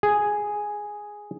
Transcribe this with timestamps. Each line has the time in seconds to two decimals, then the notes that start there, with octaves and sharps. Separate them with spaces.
0.03 G#4